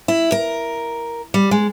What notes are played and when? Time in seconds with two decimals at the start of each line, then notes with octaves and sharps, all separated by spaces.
0.08 E4
0.32 A#4
1.34 G3
1.51 G#3